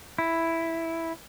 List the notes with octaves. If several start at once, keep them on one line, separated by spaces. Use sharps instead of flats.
E4